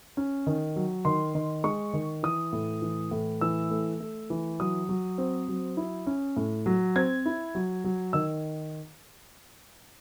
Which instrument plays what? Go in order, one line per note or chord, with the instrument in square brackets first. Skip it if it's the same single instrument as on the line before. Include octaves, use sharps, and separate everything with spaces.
[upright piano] C#4
D#3
F#3
D#3 C6
D#3
G#3 C#6
D#3
E3 D#6
A2
E3
A2
E3 E6
A3
A3
E3
F#3 D#6
F#3
C4
F#3
E4
C#4
A2
F#3
C4 G#6
E4
F#3
F#3
D#3 E6